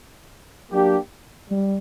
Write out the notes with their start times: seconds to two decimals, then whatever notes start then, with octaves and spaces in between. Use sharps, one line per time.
0.69 F#3 A#3 D4 G4
1.49 G3